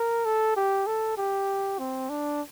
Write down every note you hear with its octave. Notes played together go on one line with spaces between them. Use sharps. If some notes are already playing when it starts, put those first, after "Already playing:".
Already playing: A#4
A4
G4
A4
G4
C4
D4